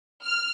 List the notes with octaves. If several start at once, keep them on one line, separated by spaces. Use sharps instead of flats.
F6